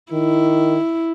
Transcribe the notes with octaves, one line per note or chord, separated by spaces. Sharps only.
D#3 E4